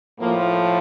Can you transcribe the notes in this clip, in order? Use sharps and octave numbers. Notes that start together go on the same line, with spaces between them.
A2 F3 A#3